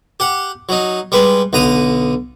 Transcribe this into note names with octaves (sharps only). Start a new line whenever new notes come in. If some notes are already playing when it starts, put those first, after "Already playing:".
G4 F#5
F#3 D#4
G3 G#3 B4
B1 D3 A#5 D#6